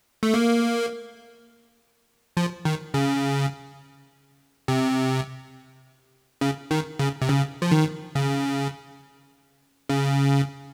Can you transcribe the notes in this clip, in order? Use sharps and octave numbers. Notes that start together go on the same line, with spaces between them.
A3
A#3
F3
D#3
C#3
C3
C#3
D#3
C#3
C3
C#3
F3
D#3
C#3
C#3